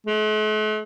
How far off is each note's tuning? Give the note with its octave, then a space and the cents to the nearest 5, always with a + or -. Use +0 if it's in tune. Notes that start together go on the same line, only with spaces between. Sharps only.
A3 -45